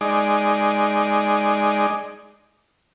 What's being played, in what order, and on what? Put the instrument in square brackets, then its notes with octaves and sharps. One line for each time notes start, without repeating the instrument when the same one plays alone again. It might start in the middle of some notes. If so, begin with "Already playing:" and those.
[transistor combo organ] G#3 D#4 D5